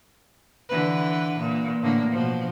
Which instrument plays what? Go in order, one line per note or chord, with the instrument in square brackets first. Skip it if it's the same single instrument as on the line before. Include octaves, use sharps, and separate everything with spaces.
[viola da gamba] D3 E3 B4
A#2
A2 D3 A#3
B2 F3